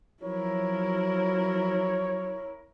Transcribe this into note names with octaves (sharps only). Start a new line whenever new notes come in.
F3 F#3 E4 A#4 C#5